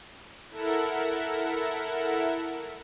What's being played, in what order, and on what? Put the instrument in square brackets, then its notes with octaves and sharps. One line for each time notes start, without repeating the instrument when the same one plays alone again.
[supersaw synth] E4 A4 A#4 E5 F#5